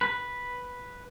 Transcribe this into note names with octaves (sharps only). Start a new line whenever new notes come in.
B4